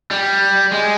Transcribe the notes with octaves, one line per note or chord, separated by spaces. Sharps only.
G3
G#3